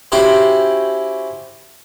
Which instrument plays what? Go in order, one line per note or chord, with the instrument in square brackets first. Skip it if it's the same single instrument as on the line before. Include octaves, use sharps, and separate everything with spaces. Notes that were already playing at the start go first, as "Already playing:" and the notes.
[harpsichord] C#4 E4 F#4 G4 C5